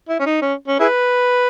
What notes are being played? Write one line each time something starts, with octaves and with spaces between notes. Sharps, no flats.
E4
C#4
D#4
C#4
C#4
E4 G#4 B4